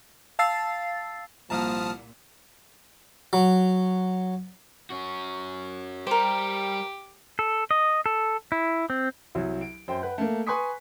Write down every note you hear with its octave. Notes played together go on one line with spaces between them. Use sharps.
F5 A5 E6 A6 C7
C2 A#2 F3 A5 A#5 D#6 F6
F#3
C#4 F#4
G3 G4 A#4 C5
A4
D#5
A4
E4
C4
C2 F#3
D7
F#2 C5 G5
B4 F#5 G5
A3 A#3
B4 G#5 C6 C#6 D#6 B6